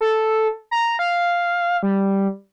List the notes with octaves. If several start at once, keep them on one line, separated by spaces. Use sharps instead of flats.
A4
A#5
F5
G3